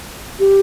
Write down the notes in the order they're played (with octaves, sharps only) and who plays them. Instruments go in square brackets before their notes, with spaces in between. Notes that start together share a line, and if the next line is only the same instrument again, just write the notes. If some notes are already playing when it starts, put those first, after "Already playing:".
[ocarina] G4